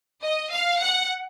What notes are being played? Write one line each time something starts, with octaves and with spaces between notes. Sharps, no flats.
D#5
F5
F#5